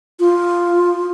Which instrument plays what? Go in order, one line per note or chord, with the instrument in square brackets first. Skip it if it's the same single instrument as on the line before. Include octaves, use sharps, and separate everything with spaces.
[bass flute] F4